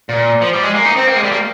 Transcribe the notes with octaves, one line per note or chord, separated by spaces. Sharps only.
A#2
F3
G3
G#3
A#3
D#4
C4
A#3
G#3
G3
A#3